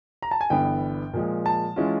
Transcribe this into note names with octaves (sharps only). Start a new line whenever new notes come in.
A#5
A5
G#5
G1 G2 E3 G3 B3 G5
A#2 F3 G#3
A5
E3 G#3 C#4 F4